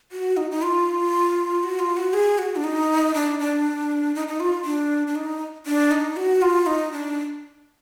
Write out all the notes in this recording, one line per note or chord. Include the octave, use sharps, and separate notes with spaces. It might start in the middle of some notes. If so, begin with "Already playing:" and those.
F#4
D#4
D#4
F4
F#4
F4
F#4
G#4
F#4
D4
D#4
D4
D4
D#4
D#4
F4
D4
D4
D#4
D4
D#4
F#4
F4
D#4
D4